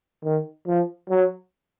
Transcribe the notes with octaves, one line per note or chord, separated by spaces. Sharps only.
D#3
F3
F#3